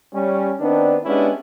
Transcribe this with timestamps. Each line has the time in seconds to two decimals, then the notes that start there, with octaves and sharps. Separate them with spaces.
0.14 G3 C#4
0.60 D#3 B3 C4 D4
1.05 G#3 B3 C#4 D4 E4 G4